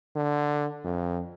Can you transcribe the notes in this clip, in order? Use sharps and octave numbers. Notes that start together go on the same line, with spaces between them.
D3
F2